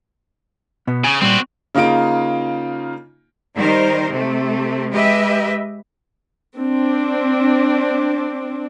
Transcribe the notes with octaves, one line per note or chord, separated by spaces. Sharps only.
B2 B3
C#3 G#5
A#2 G3 C4 F#4
C#3 A#3 D#4 F4 D7
D#3 G3 D#4 A#4 C5
C3 A3
G#3 G4 B4 D#5 E5
C4 D4